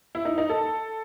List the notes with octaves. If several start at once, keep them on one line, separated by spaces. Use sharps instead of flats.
E4
D#4
D#4
A4